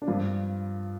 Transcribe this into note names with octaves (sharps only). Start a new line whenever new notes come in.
D4
G2 F3 F4